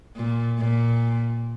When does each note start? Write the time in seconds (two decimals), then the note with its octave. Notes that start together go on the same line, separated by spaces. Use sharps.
0.16 A#2
0.59 A#2